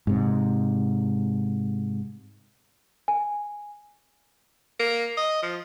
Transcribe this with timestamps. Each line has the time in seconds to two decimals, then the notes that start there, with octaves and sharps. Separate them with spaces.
0.07 G#2 C3
3.08 G#5
4.79 A#3
5.17 D#5
5.42 F3